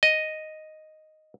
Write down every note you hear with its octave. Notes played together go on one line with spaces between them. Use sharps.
D#5